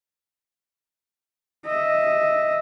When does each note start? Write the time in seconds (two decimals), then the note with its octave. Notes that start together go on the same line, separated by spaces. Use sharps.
1.66 D#5 E5